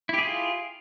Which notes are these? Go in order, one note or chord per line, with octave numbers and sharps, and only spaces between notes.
E4 F4 G4 G#4